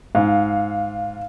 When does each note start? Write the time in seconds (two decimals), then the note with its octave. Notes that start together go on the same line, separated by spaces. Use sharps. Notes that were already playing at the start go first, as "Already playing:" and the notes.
0.15 G#2 F5